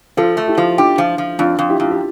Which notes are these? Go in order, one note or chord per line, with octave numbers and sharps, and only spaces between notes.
F3 F4 A4
A3
E4 G4
F3
D4 F4 G4
F3
F3
F2 D4 F4
F2
E4 G4
F2 F4
G4